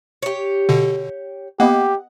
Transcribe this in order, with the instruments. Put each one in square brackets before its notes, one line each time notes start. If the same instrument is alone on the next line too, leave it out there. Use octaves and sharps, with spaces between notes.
[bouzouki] G4 C#5
[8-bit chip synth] B2 D3
[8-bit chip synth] A#3 [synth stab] B3 D#5 F#5 [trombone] G4